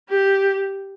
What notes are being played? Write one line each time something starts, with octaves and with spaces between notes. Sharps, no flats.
G4